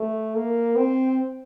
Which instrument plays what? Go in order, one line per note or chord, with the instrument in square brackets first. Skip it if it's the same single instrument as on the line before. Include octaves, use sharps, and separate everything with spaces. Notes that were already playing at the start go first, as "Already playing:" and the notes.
Already playing: [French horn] A3
A#3
C4